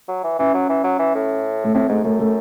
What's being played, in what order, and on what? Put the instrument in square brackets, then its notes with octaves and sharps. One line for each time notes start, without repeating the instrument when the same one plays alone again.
[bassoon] F#3
E3
[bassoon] E3 [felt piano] C#4
[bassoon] F#3
E3
F#3
E3
A2
[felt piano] A3
[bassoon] A2 [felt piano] C4
[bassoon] G#2 [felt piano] A3
[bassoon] F#2 [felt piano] A3
[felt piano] A3